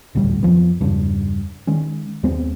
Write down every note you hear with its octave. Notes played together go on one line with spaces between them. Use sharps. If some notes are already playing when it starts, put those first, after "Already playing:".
D#1 A1 D2 G3
F2 F3 B3
E2 G2 C#3
D#3 G#3 C#4
D#2 G#3 B3 C4